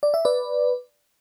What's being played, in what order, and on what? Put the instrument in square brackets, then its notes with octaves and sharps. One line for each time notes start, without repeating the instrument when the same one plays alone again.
[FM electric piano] D5
E5
B4 D5